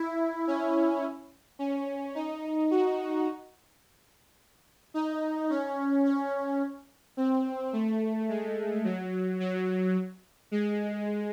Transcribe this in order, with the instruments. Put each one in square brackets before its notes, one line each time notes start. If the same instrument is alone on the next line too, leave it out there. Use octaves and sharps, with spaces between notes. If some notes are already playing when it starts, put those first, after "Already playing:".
Already playing: [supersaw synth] E4
C#4
C#4
D#4
F#4
D#4
C#4
C#4
C4
A3
G#3
F#3
F#3
G#3